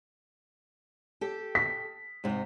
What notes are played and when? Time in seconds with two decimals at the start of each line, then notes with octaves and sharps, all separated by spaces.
1.21 G4 A4
1.55 B6
2.24 G#2 C3 D#4